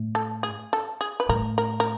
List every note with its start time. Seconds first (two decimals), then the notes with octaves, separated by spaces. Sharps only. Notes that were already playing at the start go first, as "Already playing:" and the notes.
Already playing: A2
0.15 A4
0.43 G#4
0.73 A4
1.01 G#4
1.20 B4
1.29 A2 A#4
1.58 A#4
1.80 A#4